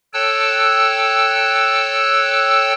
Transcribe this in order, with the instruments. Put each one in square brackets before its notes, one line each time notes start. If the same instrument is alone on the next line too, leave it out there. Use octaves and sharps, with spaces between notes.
[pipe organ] A4 C#5 G5 A5 E6 F#6